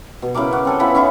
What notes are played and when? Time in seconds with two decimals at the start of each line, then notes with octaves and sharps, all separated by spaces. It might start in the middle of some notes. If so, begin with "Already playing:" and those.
0.22 B2
0.34 C#3 E4 A#4 D6
0.53 F#4
0.65 C4 A4 G#5
0.79 B3 E4 F4 B5
0.95 C#4 D#4 E4 G#4